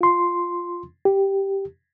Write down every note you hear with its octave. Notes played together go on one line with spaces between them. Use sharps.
F4 C6
G4